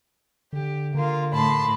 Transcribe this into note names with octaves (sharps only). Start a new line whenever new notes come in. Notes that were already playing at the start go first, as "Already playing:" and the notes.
D3 G4
D3 A#3 F4
A2 A5 B5 C6